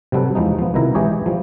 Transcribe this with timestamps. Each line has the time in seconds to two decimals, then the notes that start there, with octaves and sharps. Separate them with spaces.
0.12 C3 F#3 G3 A4 B4
0.35 E2 F3 G#3 D#4
0.59 F3 B3
0.74 C2 B2 D#3 E4 A#5
0.95 E3 G#3 G4 G#4 C#5
1.26 F3 G3